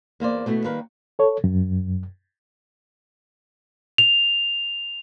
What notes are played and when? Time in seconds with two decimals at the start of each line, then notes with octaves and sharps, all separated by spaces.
0.20 E2 A#3 C5 D5
0.46 B2 A3 B3 E4
0.64 D#3 G3 A#3 A#4 B4
1.19 A4 C#5
1.44 F#2
3.98 F7